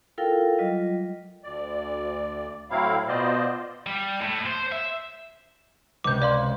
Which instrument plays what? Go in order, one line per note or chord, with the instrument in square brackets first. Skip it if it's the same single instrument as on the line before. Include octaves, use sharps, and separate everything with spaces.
[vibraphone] E4 F4 A4 A#4 F5 G5
F#3 G3 F4 D#5
[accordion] D2 D5
A2 F#3 C4 E4 F5
B2 B3 F4 C5 D5 D#5
[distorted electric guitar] G3
A2
C5
E5
[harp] C#2 C3 [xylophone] D6 G6
[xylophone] D5 F5 C6